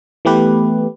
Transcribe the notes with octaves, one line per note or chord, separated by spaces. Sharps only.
E3 A3 B3 G4 B4